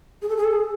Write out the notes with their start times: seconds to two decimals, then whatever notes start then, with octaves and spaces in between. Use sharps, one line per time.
0.22 G#4
0.29 A4
0.37 G#4
0.44 A4
0.52 G#4